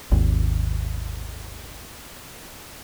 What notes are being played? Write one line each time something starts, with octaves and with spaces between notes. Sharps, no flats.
G#1 D#2